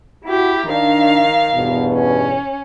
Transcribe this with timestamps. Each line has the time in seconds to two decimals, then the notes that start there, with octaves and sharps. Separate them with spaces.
0.25 E4 F#4 G4
0.69 D#3 D4 F5
1.55 E2 G2 B2
1.93 C#4